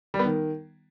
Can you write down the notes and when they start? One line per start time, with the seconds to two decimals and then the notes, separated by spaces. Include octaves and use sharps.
0.14 G3
0.19 B3
0.25 D#3